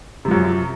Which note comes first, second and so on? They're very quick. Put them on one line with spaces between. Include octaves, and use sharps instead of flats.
C3 F3 F#2